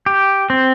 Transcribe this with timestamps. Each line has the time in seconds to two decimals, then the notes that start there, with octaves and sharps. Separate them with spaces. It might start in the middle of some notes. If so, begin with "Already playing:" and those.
0.06 G4
0.50 C4